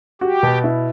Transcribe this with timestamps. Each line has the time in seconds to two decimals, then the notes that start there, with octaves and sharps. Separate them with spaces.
0.21 F#4 G4
0.43 B2
0.64 E4